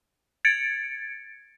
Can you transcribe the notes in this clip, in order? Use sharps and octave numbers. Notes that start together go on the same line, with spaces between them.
G#6 A6 C#7 D7